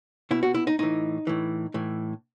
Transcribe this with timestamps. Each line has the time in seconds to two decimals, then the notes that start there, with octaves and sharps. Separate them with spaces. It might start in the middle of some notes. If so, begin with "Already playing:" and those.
0.31 B2 E4
0.43 F#4
0.54 E4
0.67 D#4
0.79 A2 E3 D#4
1.27 A2 E3
1.74 A2 E3